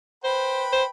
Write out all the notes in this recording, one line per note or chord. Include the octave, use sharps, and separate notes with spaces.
B4 C5 G5 B5
C5